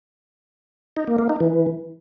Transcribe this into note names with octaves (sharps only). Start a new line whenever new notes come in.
D#4
A#3
A#3
D#4
E3